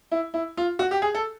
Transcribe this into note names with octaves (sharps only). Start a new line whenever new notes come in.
E4
E4
F4
F#4
G4
G#4
A4